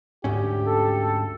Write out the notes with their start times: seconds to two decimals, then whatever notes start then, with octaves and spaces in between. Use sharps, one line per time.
0.24 D2 G#2 C#4 G4
0.65 A4